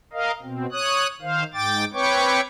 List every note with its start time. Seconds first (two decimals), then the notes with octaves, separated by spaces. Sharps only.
0.13 A#4 D#5 F5
0.43 B2 C4
0.72 C#5 D#6 F#6
1.22 D#3 C5 F5
1.54 G#2 G5 D6 A6
1.93 C4 B4 C#5 G5 C#6 D6